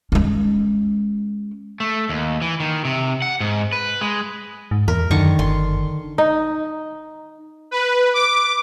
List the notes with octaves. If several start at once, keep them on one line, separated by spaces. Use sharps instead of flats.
G#3 C#4
A3
D#2
E3
D#3
C3
F#5
G#2
B4
G#3
G#2
E2 A#4
F#2 D3 D#3 C#6
G1 C6
D#4
B4
D6